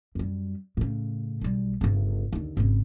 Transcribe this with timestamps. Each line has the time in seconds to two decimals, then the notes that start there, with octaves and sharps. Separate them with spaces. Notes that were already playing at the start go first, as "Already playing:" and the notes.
0.15 F#2 G3
0.77 A2 C#3
1.41 B1 G3
1.81 G1 C#3
2.32 D#2 D3
2.57 G#1 C#3